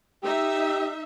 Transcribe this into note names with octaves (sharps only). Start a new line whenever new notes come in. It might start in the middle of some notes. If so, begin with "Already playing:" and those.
D#4 G4 E5